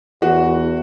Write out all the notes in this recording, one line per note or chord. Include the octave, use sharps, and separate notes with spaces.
E2 F#4